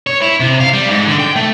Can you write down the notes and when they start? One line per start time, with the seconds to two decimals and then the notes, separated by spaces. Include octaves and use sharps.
0.07 C#5
0.22 E4
0.40 C3
0.60 F5
0.73 G3
0.89 G#2
1.07 D3
1.20 G5
1.36 A3